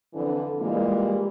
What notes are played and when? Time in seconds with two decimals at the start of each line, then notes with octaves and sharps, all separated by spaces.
0.14 F2 D3 E3
0.60 A#2 E3 G3 G#3 A#3 E4